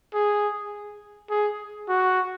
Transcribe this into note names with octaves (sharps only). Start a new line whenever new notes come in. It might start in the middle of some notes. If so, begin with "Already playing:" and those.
G#4
G#4
F#4